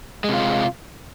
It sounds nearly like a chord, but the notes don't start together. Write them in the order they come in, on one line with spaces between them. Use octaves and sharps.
G#3 C3 F4